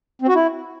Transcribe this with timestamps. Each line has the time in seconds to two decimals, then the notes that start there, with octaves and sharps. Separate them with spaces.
0.22 C4
0.28 F#4
0.35 E4